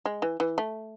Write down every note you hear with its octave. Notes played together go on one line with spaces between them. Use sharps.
G#3
E3
E3
A3